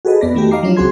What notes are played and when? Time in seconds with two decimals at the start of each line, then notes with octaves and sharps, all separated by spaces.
0.05 F#4 G#4 A4 B4 D#5
0.21 F2 B3 D5 B5 A#6
0.35 D#3 A3 F#4 G4
0.51 D#5 F5 A#5 D6 C7
0.63 F3 F#3 C#4 D4 F4
0.77 C#2 C4 F#4 G#4 C6 G#6